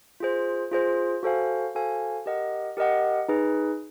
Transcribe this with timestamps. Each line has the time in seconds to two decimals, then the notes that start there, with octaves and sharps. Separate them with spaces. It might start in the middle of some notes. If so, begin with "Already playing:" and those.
0.20 F4 G#4 C5
0.72 F4 G#4 C5
1.23 F#4 A4 C5 F5 G#5
1.75 F#4 A4 C5 F5 G#5
2.26 G4 A#4 D#5 F#5
2.77 G4 A#4 D#5 F#5
3.29 D#4 G#4 B4